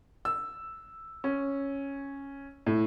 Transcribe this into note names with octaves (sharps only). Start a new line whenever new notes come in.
E6
C#4
A2